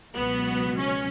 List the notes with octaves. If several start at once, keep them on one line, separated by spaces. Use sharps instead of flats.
C#2 B2 F#3 B3
C#4